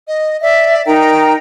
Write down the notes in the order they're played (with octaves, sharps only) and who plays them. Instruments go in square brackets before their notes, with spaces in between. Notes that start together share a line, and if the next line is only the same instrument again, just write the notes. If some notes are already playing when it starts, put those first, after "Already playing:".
[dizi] D#5
[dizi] D5 [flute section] E5
[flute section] D#4 A#4 A#5 [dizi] G5